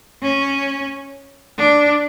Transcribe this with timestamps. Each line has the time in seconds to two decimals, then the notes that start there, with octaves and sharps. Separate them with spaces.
0.22 C#4
1.58 D4